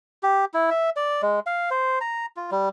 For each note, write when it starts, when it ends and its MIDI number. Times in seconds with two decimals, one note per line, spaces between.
0.23 0.45 67
0.54 0.70 64
0.71 0.90 76
0.96 1.22 74
1.22 1.40 56
1.46 1.70 77
1.71 1.99 72
2.01 2.26 82
2.37 2.50 65
2.52 2.69 55